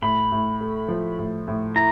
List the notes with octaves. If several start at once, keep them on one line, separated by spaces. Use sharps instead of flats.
A2 B5
A2
A3
F3
A2
A2
E4 A#5